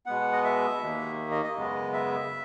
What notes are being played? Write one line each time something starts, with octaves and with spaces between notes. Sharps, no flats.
B2 G#3 B3 F#5
D#5
E5
D#2 D#3 A#3
D#5
D#5
F#2 C#3 G#3 B3
E5